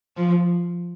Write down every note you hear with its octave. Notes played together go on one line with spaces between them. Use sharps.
F3